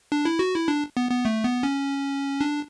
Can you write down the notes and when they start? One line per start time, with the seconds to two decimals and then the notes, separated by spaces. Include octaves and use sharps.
0.12 D4
0.25 E4
0.39 F#4
0.55 E4
0.68 D4
0.97 B3
1.11 B3
1.25 A3
1.44 B3
1.63 C#4
2.41 D4